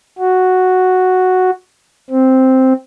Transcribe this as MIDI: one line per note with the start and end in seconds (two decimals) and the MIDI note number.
0.19 1.50 66
2.10 2.73 60